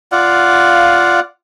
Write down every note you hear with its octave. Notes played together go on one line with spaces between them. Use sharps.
F4 D5 F5 F#5